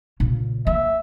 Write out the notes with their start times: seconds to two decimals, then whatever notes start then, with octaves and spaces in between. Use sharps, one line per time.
0.20 A#2 C#3
0.67 A#3 E5